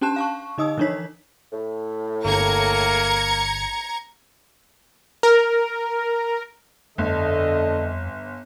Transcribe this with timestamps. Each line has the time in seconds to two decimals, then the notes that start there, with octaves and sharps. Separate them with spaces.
0.01 C#4 D4 G4 A5 F#6 E7
0.16 F5 A5 C#6
0.58 D3 D#4 D#5 D#6 E6
0.78 E3 F3 D4 D#4 C#5 B6
1.52 A2
2.25 G1 A#3 A#5 G#6 C#7
5.23 A#4
6.98 G1 F2 D3 A4 D#5